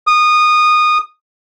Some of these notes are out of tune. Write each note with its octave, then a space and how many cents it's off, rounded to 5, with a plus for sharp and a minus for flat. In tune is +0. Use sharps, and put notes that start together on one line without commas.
D#6 -20